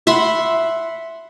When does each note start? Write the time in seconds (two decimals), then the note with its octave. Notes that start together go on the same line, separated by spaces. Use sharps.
0.07 E5 F#5 B5 C6